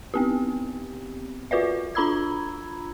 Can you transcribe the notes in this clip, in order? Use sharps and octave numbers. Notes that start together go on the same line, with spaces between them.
B3 C4 G4
F4 F#4 B4 D5 E5
D4 F4 A#5 B5 E6 G#6